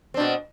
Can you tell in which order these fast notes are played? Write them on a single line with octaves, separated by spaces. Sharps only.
C4 D4 B2